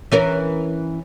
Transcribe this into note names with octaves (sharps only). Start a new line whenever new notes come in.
E3 C#4 A#4